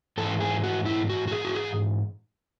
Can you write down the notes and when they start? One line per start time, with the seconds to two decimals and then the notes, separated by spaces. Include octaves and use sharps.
0.18 G#2 E3 A4
0.40 G#4
0.64 F#4
0.86 E4
1.09 F#4
1.28 F#4
1.32 G#4
1.45 F#4
1.55 G#4